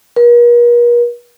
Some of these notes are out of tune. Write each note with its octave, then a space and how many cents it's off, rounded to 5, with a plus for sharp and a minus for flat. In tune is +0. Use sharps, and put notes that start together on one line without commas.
A#4 +45